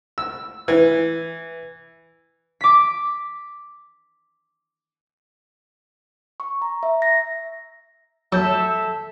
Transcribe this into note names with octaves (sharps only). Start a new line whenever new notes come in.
E6
E3
D6 B6
C#6
A#5
E5
A#6
F#3 A4 E5 E6 G6